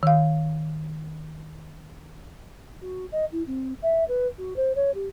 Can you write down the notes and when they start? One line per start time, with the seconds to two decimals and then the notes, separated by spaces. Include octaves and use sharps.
0.03 D#3 F5
2.81 F#4
3.12 D#5
3.31 E4
3.47 C4
3.82 E5
4.08 B4
4.38 F#4
4.56 C5
4.75 C#5
4.94 G4